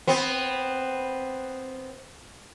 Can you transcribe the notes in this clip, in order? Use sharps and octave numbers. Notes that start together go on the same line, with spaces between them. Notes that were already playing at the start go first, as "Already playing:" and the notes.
B3 C4